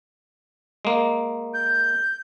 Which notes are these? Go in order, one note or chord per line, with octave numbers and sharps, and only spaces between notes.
G#3 A#3
G6